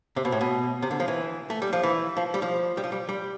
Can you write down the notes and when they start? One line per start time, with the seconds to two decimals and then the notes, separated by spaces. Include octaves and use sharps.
0.16 C3
0.25 B2
0.32 A2
0.41 B2
0.82 C3
0.91 D3
1.00 F3
1.08 E3
1.50 A3
1.62 G3
1.73 F3
1.83 E3
2.17 F3
2.34 G3
2.42 F3
2.77 G3
2.84 F3
2.92 G3
3.09 G3